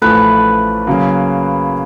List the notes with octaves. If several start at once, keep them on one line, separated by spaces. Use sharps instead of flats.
A1 A2 F3 A3 B4
C#3 F#3 A#3